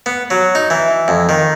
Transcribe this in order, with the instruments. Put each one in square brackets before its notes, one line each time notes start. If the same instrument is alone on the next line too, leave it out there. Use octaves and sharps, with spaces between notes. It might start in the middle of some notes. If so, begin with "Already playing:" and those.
[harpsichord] B3
F#3
D#4
E3
F2
D#3